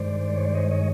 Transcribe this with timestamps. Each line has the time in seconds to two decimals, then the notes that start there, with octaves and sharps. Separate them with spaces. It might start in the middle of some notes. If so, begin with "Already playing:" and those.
Already playing: G2 D#3 G#3 C5 D5
0.36 C#5
0.45 D5
0.55 C#5 D#5
0.71 C#5 D#5